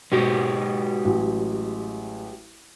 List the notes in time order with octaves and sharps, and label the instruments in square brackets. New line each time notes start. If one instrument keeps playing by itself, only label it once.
[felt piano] G#2 B2 [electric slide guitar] G#3 G4 C#5
[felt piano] A1 F#3